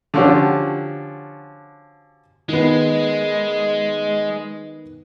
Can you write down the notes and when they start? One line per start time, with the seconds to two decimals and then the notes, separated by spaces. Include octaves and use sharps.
0.14 D3 F3 C#4 F#4 G4
2.49 D#3 G#3 B3